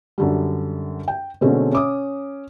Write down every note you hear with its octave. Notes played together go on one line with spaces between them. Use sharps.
F#2 D3 G3
G5
B2 D3 G#3 A3 C4 C#4
C#4 D6 D#6